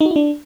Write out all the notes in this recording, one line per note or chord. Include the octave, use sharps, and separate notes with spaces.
D#4
F#4
E4
D4